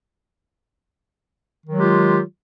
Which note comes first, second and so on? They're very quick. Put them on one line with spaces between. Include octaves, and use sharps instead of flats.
D#3 F#3 G#3 G4 F4